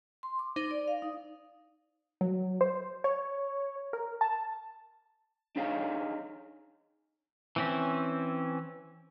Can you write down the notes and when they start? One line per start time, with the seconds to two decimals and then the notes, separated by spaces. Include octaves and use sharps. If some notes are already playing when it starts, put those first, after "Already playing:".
0.23 C6
0.39 D6
0.56 D#4 C5
0.71 D5
0.88 F5
1.02 D#4
2.21 F#3
2.61 C5
3.04 C#5
3.93 A#4
4.21 A5
5.56 D4 D#4 G#4 C#5 F5
7.56 E3 C4 C#4